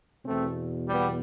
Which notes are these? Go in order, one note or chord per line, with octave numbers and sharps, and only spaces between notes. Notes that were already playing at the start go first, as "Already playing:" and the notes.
E2 B2 A3 C4
G3 B3